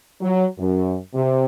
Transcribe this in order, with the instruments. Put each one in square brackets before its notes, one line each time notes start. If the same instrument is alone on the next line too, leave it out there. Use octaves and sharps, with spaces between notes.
[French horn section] F#3
F#2
C3